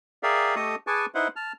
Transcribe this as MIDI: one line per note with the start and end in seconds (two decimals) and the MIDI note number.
0.23 0.55 68
0.23 0.55 70
0.23 0.55 74
0.23 0.55 76
0.23 0.55 77
0.23 0.55 79
0.56 0.75 57
0.56 0.75 67
0.56 0.75 69
0.56 0.75 75
0.56 0.75 85
0.56 0.75 87
0.87 1.06 68
0.87 1.06 71
0.87 1.06 80
0.87 1.06 81
0.87 1.06 85
0.87 1.06 86
1.15 1.28 63
1.15 1.28 64
1.15 1.28 71
1.15 1.28 72
1.15 1.28 78
1.36 1.53 81
1.36 1.53 89